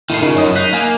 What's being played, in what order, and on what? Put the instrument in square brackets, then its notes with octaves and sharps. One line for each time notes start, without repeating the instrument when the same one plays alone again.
[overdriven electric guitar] A2 D#3 [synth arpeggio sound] E4 C7
[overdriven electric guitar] C#3 [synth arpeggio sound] D#4 F4 A#4
[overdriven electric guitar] F#2 [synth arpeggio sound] C#5 D#5
[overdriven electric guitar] D#4 [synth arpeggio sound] F#6 B6 C7
[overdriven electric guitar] A#3 [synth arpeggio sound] F5 G#5